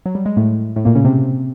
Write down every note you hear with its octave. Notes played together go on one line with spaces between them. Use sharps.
F#3
G3
G#3
A2 A3
A2 A3
A#2 A#3
C#3 C#4
C3 C4